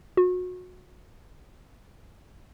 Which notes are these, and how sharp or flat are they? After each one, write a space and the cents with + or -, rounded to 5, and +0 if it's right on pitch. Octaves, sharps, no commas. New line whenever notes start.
F#4 -30